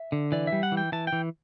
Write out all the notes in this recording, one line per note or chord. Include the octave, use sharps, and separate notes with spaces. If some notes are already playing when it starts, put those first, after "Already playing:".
Already playing: E5
D3
E3 D5
E5
G3
F#5
E3
G5
E3 A5
G5
E3